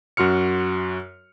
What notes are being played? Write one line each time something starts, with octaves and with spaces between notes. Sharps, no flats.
F#2 F#4 C6 F6 C#7